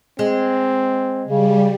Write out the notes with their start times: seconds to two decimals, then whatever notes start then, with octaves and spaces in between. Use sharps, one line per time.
0.19 G#3 C4
1.25 C#3 G3